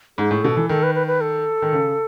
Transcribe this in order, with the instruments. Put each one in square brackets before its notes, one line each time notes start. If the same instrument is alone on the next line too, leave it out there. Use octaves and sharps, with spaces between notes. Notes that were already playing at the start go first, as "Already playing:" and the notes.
[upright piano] G#2 [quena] G#4
[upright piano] A2
[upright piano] B2 [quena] A4
[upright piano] E3
[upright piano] D#3 [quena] A4
[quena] B4
B4
B4
A4
[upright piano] D#3
C#3